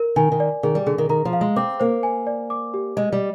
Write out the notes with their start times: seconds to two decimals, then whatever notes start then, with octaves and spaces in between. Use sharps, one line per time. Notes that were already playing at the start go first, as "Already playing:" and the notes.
Already playing: A#4
0.16 D#3 G#5
0.32 D#3
0.40 D5
0.63 D#3 G#4
0.75 G3
0.86 D3 G#4
0.98 D#3
1.09 D#3 A#5
1.25 F3
1.33 F5
1.41 G#3
1.56 C4 D6
1.80 A#3 C5
2.03 G#5
2.27 D5
2.50 D6
2.74 G4
2.97 G#3 D#5
3.12 G3